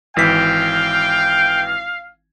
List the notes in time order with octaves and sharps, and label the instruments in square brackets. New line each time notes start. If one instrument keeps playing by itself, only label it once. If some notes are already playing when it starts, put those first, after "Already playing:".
[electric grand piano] G#1 E3 B6 [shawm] F5 [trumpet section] G5